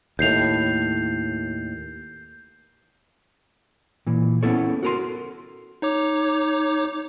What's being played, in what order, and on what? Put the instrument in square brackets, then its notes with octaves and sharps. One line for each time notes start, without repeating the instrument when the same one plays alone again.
[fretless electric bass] D#2 A2 [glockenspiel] G6 C7 F7
[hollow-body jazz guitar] A#2 E3
B3 C#4 E4 A4 C#5
F#4 A4 A#4 A#5 C6
[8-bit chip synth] D#4 C#5 D6